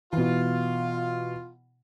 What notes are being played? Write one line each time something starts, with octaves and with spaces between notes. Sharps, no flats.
B2 E3 F4